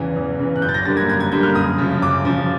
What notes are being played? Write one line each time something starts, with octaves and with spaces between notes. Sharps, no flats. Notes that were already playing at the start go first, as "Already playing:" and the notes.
Already playing: E2 C#3 E3
E2
C#3 E3
F#6
F#2 G6
A6
A#6
D3 G3 A#3 A6
G#6
F#2 G#6
G#6
D3 G3 A#3 G6
F6
F#2 D#6
C#3 F3
F#2 D6
C#3 F3